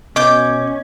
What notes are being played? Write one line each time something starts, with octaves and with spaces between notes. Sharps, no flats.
B2 C#4 D#5 D6 G6